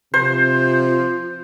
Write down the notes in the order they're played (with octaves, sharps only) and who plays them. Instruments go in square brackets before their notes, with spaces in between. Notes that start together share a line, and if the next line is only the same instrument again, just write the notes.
[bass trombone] C3 [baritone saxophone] F3 [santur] C5